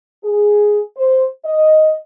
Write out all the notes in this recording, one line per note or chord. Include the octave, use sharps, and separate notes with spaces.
G#4
C5
D#5